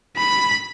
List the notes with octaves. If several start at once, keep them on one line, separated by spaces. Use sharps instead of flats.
B5